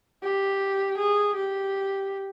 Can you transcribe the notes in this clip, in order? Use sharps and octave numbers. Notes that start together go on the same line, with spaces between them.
G4
G#4
G4